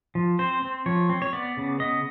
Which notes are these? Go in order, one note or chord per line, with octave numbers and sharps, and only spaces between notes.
F3
C4 C5
C4
F3 C#5
C4
C#5
B3 D5
C#3
B3 D#5